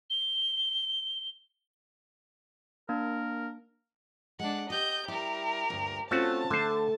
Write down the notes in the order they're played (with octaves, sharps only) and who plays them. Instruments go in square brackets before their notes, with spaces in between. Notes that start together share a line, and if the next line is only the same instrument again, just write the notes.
[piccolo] G7
[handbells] A#3 D4 [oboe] A#4
[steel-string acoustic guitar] G#3 [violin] D4 F#5
[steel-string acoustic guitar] G4 [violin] D#5 G6
[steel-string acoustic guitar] G3 E4 [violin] G4 A#4
[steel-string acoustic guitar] D2 G2 A#2
[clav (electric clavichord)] A3 F#4 [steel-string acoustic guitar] C4 C#4 F4 [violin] A5
[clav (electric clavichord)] D3 C5 [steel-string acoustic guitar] A3